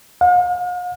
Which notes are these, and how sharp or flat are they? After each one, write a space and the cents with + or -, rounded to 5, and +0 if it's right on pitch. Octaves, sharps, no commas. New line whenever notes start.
F5 +45